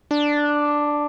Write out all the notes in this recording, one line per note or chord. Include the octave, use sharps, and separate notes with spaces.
D4